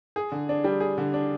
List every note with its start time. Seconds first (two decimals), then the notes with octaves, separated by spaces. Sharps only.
0.16 G#4
0.32 D3
0.49 D4
0.64 G3
0.80 G#4
0.98 D3
1.14 D4